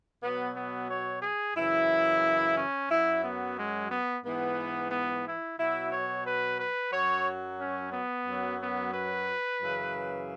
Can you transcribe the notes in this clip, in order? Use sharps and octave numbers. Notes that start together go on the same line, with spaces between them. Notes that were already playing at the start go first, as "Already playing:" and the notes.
B2 F#3 B3
B3
C#5
G#4
F#2 C#3 E3 E4
C#4
F#2 F#3 E4
B3
G#3
B3
G#2 E3 B3
B3
E4
B2 F#3 E4
C#5
B4
B4
F#2 F#3 C#5
C#4
B3
F#2 F#3
B3
B4
F#2 C#3 E3